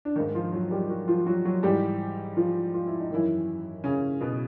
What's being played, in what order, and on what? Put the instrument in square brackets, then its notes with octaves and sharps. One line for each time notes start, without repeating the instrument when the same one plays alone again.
[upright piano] D4
D#3 D#4
G#2
F3 F4
F#3 F#4
G3 G4
F#3 F#4
F3 F4
F#3 F#4
F#3 F#4
G#2 E3 G3 G4
F3 F4
F4
E4
D#4
F#2 D#3 E3 E4
C#3 C#4
B2 B3